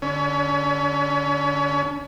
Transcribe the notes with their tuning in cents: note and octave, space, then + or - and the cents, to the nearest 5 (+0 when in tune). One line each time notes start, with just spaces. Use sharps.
D3 +0 C#4 +35